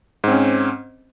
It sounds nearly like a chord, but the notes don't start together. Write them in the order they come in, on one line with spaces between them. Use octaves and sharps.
G#2 C4 C#4